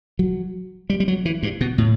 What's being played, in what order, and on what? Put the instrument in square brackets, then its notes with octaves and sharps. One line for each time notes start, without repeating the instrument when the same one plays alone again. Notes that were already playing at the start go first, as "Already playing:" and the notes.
[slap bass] F#3
G3
G3
F#3
E3
G2
B2
A2